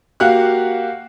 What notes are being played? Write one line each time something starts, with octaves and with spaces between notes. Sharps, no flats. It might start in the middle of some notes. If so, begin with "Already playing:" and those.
A#3 F#4 G4 F5 F#5 F#6